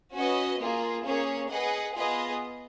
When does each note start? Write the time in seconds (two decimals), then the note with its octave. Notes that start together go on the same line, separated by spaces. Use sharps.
0.15 C#4 F#4 B4 D#5
0.60 A#3 F4 G#4
1.05 A#3 C#4 G#4 C#5
1.51 G#4 B4 D#5 F#5
1.96 B3 F4 G#4 B4 D#5